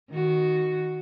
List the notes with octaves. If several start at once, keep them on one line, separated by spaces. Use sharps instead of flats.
D#3 F#4